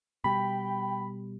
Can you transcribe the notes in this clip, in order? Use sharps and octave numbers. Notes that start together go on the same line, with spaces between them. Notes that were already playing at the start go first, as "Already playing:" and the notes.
B2 G3 G5 B5